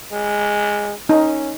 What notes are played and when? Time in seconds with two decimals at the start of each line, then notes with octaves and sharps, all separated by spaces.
0.12 G#3
1.09 C#4 D#4